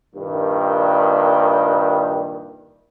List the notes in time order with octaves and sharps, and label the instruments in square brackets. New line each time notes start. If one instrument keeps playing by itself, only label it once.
[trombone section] C2 G2 A#2 D#3